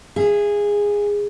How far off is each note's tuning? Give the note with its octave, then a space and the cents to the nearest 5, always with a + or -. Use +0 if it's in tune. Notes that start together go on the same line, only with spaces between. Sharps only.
G#4 -15 E5 +35